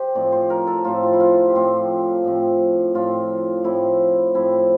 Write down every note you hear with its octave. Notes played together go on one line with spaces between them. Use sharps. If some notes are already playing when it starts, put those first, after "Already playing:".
Already playing: G4 C5
A2 F3 C4 D5
C5
A#4
A4
A2 F3 C4 F4
F4
E4
F4
G4
A2 F3 C4 F4
A2 F3 C4
A2 F3 C4 F4
A2 F3 C4 E4
A2 F3 C4 E4